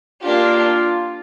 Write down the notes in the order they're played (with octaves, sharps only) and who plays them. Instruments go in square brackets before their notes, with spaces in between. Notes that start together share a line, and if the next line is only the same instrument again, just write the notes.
[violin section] A#3 D4 G4 [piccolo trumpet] F4